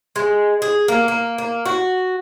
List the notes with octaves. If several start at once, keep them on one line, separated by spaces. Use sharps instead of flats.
G#3
G#4
A#3
A#3
A#3
F#4